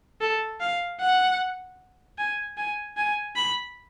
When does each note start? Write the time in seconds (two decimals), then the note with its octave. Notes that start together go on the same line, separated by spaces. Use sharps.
0.21 A4
0.60 F5
1.00 F#5
2.18 G#5
2.57 G#5
2.97 G#5
3.36 B5